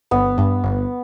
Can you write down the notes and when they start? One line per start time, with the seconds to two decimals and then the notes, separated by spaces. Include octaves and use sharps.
0.11 G1 B3
0.38 G2
0.64 G1